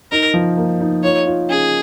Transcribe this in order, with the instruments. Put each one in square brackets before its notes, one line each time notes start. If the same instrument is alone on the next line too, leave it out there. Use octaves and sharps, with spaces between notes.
[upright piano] D#4 [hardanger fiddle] A#4
[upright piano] F3
A#3
D#4
[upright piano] F4 [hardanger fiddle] C#5
[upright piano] F4
[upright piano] C#4 [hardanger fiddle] G#4